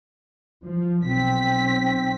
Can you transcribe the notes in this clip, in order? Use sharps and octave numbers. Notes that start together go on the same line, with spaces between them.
F3
B1 C4 B6